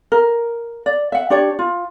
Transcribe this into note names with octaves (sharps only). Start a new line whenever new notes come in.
A#4
D5
E5 F#5
D4 G4 C#5 D5
F4